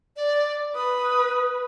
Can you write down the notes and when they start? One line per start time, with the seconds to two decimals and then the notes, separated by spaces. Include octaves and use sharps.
0.16 D5
0.75 B4 D#6